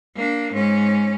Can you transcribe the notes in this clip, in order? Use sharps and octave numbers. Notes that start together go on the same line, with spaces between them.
A#3 D4
G#2 C#4